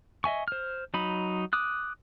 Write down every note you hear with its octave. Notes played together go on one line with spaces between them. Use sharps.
D#5 E5 G#5 C#6
C5 F6
F#3 D#4 B5
D6 D#6 F#6